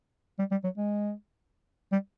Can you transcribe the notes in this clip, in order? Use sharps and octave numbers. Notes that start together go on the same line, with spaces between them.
G3
G3
F#3
G#3
G3